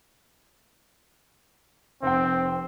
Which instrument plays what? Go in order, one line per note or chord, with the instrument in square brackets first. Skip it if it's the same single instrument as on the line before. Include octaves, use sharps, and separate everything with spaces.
[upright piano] F1 G5 [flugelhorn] C4